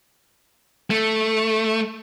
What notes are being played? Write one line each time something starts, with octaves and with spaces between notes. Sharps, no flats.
A3